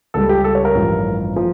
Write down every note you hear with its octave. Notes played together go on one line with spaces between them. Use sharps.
C#2 C#3 G3 A4
G4
A4
C#5
A#4
A1 G2 F3
F3